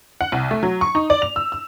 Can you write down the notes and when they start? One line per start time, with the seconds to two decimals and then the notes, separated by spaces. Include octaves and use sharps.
0.21 F#5
0.32 C2
0.51 A3
0.63 F#3
0.81 C#6
0.95 D#4
1.10 D5
1.22 F7
1.36 E6
1.52 E6